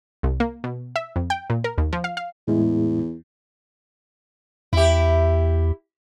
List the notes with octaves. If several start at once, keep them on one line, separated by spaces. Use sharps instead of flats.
C2
A#3
B2
E5
F2
G5
A#2
A#4
D#2
F3
F5
F5
E2 A2 G#3 E4
E2 E4 G4